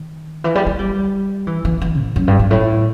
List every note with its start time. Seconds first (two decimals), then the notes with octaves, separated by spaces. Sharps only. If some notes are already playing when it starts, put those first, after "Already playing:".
Already playing: D#3
0.44 E3
0.55 G3
0.67 A3
0.79 G3
1.47 E3
1.65 E3
1.82 E3
1.99 A2
2.16 F#2
2.28 G2
2.39 G2
2.51 A2